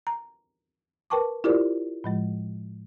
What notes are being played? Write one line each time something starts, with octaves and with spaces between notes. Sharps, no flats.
A#5
A#4 B4 G5 A5 C#6 D6
E4 F4 G4 A#4 C5 D5
A2 F3 G#3